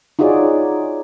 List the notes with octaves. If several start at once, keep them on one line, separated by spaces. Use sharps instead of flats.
D#4 F4 F#4 G#4 C#5 D5